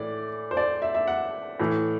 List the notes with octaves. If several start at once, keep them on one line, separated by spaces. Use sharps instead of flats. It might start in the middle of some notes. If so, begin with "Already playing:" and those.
Already playing: A2 E3 D5
C5
D5
E5
E5
F#5
A2 E3